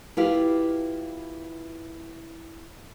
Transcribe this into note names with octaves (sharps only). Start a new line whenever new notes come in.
E4 F4 G4 B4 F5